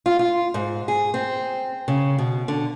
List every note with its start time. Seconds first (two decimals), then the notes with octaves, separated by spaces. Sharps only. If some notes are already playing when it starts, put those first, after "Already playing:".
0.06 F4
0.19 F4
0.54 G#2
0.88 G#4
1.14 C4
1.88 C#3
2.18 B2
2.48 D3